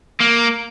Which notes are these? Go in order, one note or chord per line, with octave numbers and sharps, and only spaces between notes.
A#3